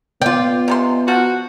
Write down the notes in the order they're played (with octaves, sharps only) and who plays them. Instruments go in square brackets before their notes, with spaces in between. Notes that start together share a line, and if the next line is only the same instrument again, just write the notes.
[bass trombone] B3 [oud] F4 D5 [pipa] G5
[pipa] C3 G#3 C6
[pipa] F3 [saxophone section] F#4